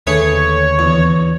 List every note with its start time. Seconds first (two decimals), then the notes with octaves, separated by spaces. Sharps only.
0.07 D#2 D3 A3 G#4 B4 C#5
0.79 E2